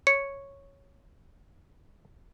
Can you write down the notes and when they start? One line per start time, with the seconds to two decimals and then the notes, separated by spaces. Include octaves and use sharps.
0.07 C#5 C#7